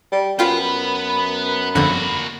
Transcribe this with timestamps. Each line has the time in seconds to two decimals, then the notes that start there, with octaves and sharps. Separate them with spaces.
0.12 G3
0.39 F#2 B3 F4 B4 G5 B5
1.75 G1 F2 A#2 D3 F#4